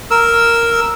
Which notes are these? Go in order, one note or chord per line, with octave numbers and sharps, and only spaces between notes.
A#4 E6